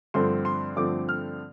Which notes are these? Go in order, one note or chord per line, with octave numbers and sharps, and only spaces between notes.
G2 D3 F3 A3 C4 C6
C6
G2 D3 F3 A3 C4 D6
F6